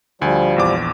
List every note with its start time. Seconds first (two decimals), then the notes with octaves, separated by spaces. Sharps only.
0.22 D2 F3 G3 G#5
0.56 A#1 E2 D6